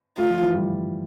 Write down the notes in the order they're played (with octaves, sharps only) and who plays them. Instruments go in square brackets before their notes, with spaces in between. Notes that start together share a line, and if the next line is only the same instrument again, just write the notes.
[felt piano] A3 [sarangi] F4
[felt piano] F3
E3
G3